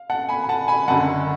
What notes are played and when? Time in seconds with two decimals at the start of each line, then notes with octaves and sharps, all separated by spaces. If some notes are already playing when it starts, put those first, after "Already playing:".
Already playing: F5
0.10 F#5 A5
0.29 G#5 B5
0.44 B5
0.49 F#5 A5
0.68 G#5 B5
0.88 F#1 F#2 D3 F#5 A5